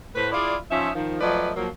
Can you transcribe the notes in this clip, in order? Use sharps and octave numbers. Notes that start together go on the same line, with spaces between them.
A2 B4 C5
E4 F4 G#4 D5
F3 C#4 D#4 F4 E5
D#3 F3
F3 F#3 A3 B4 D5 D#5
F3 F#3 A#3